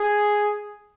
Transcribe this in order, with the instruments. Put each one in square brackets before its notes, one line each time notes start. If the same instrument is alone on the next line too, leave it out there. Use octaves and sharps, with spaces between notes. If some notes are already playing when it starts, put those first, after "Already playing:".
Already playing: [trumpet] G#4